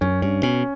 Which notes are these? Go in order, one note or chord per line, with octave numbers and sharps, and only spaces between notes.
F#2 C#4
G2 C#4
B2 C#4